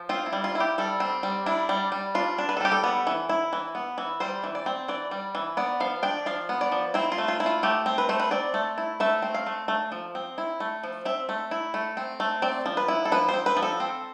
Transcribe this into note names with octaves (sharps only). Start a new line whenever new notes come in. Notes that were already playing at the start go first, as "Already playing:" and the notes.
Already playing: F3
C4 F4
E4
G3
F4
E4
G4
G3 A4
C4
G3
D4 E4
G3
G3
D4 F4
D4
B4
A4
G3 G4
A4
B3
E3
E4
E3
B3
E3
G3 C5
E3
D5
C4
E3 D5
G3
E3
B3 D5
F3 F5
D4 G5
F3 F5
B3
D5
F3
C4 E4
F4
A3
F4
E4
F4
A3 G4
C4
B4
A3 C5
B4
C4 D5
A3
E4
A3 E5
C4
F5
A3
A3
F3
C4
E4
A3
F3
C4 E5
A3
E4
A3
C4
A3
C4 D5
F3
B4
E4
A4
F3 B4
C4 C5
B4
F3
A4
C4